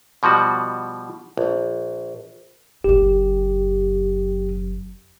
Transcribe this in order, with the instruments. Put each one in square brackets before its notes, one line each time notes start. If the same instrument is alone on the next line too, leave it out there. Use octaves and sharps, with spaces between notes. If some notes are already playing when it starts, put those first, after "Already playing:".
[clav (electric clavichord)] B2 F3 G3 F#4
A#1
[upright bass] F#1 F#2 [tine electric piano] G4